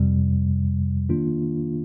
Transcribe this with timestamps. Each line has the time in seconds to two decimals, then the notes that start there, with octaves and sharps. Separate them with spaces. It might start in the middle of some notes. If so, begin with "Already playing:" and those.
Already playing: F2 C3 G3
1.09 D#3 A#3 D4 F4